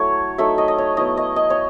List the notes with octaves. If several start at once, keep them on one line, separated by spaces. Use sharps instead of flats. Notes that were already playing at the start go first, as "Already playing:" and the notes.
Already playing: F#3 A3 E4 C#5
F#3 A3 D#4 E5
D#5
D#5
C#5
F#3 B3 E4 D#5
D#5
D#5
C#5